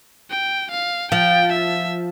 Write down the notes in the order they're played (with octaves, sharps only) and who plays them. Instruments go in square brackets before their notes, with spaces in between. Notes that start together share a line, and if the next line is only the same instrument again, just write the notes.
[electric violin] G5
F5
[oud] F3 [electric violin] G5
[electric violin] E5